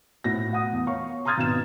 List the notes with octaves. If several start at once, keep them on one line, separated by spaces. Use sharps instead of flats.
A2 F#4 A#6
F#5 D#6
E2
C#5 F5 C#6
A#5 C6 D#6 F6 G#6 A6
G#1 B2 E7